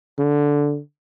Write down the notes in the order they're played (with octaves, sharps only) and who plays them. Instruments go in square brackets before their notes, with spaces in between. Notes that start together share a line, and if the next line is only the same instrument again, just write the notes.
[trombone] D3